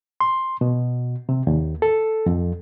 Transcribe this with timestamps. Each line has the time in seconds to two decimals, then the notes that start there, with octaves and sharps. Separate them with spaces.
0.20 C6
0.61 B2
1.29 C3
1.47 D#2
1.82 A4
2.26 F2